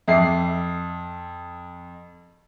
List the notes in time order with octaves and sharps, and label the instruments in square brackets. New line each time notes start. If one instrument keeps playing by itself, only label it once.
[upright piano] F2 C7 [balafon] E5 D6